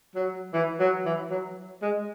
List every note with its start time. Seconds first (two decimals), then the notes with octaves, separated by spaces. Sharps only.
0.15 F#3
0.53 E3
0.80 F#3
1.05 E3
1.30 F#3
1.82 G#3